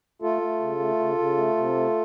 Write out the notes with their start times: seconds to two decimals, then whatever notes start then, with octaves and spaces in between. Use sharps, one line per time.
0.22 A3 F4 A4
0.41 A3
0.60 C#3
0.79 A3
0.99 C#3
1.18 C#3
1.37 A3
1.57 C3
1.76 A3